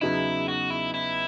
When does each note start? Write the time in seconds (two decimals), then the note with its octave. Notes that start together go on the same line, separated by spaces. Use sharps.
0.01 E2 C#3 F#3 B3 D#4 E4
0.48 F#4
0.70 E4
0.94 E4